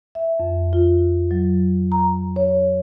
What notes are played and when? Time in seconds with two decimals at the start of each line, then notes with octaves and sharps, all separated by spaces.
0.15 E5
0.40 F2
0.73 F4
1.31 F#3
1.92 A#5
2.36 C#5